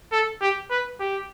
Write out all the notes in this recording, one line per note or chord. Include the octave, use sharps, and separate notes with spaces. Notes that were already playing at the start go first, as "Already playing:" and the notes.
A4
G4
B4
G4